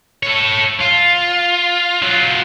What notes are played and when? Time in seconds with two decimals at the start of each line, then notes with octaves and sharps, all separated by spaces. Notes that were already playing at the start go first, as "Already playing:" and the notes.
0.23 A4 C#5
0.81 F4
2.02 F#3 F4